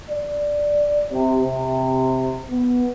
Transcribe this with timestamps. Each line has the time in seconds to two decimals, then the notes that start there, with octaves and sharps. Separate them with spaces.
0.10 D5
1.11 C3
1.42 C3
2.50 B3